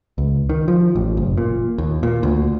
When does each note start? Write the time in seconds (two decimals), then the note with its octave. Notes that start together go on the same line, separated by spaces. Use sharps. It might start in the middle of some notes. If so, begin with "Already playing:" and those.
0.18 C#2
0.49 D#3
0.68 F3
0.96 A1
1.17 F#1
1.38 A#2
1.78 D#2
2.03 A#2
2.23 D2